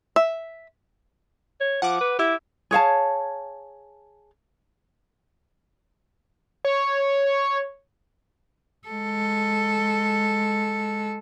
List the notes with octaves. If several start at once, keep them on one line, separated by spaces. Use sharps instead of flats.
E5
C#5
F3 F#5 D6
B4
E4 G4 D6 E6
G#4 C#5 F5 A5
C#5
G#3 A4